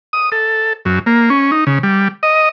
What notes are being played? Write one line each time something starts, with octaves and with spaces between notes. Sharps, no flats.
D#6
A4
F#2
A#3
C#4
D#4
C#3
G3
D#5